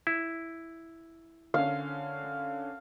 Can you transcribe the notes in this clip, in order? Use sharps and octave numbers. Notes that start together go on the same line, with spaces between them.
E4
D3 C#4 F5